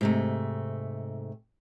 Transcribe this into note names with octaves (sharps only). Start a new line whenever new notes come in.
G#2 C3 A3